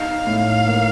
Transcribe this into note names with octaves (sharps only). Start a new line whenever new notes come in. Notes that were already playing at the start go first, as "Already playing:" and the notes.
Already playing: D#4 F5
A2
A#3